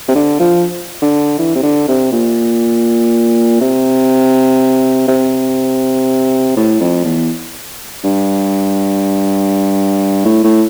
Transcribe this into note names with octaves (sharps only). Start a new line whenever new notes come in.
C3
D3
F3
D3
E3
C3
D3
C3
A#2
C3
C3
A2
F2
E2
G2
A2
A2